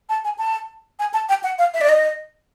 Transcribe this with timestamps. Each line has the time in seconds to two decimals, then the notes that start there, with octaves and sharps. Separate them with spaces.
0.09 A5
0.25 G#5
0.38 A5
0.99 G#5
1.14 A5
1.29 G5
1.43 F#5
1.59 F5
1.74 E5
1.81 D5
1.89 D#5